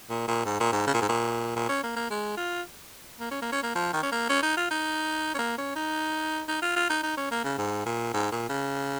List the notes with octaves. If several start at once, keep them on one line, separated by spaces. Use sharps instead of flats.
A#2
A#2
G#2
A#2
G#2
C#3
A#2
G#2
A#2
A#2
C#4
A#3
A#3
G#3
F4
A#3
C#4
A#3
C#4
A#3
F3
D#3
C#4
A#3
C#4
D#4
F4
D#4
C#4
A#3
C#4
D#4
D#4
F4
F4
D#4
D#4
C#4
A#3
C#3
G#2
A#2
G#2
A#2
C#3